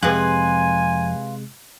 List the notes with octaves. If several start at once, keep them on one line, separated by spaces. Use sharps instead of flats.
F2 C3 G#3 F4 G#4 B4 G#5 F#6